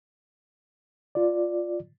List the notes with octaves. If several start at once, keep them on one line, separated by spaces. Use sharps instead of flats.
F4 D5